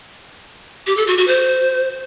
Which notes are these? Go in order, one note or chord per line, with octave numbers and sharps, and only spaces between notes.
G4
A4
F#4
F#4
C5